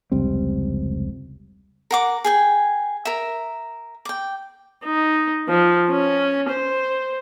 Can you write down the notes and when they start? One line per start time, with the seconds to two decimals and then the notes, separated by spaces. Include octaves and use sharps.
0.12 F1 C#2 G3 C4
1.91 A#4 F#5 D6
2.24 G#4 G5 G#5
3.05 A#4 E5
4.05 G5 D6
4.85 D#4
5.49 F3
5.90 C#4
6.50 C5